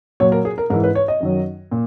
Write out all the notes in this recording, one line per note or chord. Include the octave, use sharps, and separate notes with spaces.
A#2 F#3 C#5
A#4
G#4
A#4
G#2 E3 A#4
B4
C#5
D#5
F#2 D#3 F#3
A#2